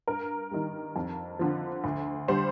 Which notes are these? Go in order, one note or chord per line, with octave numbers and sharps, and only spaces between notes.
G2 A#4
D#3 G3
F2
D3 F3
D2
D3 G3 C5